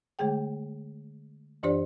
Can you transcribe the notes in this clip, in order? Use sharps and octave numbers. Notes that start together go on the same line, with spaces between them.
D3 G#3 A3 G#4 G5
F#2 E3 D4 G4 C5 D5